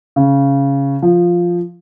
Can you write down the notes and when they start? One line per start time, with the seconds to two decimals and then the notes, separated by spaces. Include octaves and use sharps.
0.16 C#3
1.02 F3